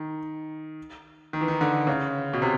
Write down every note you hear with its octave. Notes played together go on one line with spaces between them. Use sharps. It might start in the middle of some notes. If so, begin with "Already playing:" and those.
Already playing: D#3
D#3
E3
D#3
D3
C#3
B2
C3